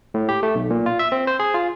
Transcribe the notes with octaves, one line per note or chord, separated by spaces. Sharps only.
A2
G4
A3
B1
A#2
F4
E5
C4
C5
G#4
F4